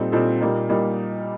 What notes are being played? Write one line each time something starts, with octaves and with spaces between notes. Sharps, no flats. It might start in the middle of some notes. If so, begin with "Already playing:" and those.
Already playing: A#2 G3 C4 D#4 A4
A#2 G3 C4 D#4 A4
A#2 G3 A#3 D#4
A#2 G3 A#3 D#4